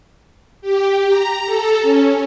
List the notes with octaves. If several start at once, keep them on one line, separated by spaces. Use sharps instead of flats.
G4
A#5
A4
C#4